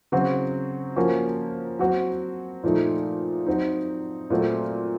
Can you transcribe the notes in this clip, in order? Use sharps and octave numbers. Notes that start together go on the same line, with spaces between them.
C#3 F#3 C4 F#4
F3 A#3 C#4 F#4
F#3 C4 F#4
A#2 F3 A3 D#4
F#3 C4 D#4
A#2 F#3 A3 C4